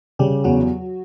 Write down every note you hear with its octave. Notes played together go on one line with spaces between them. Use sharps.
C#3 G3 G4
E2 F#3 F#4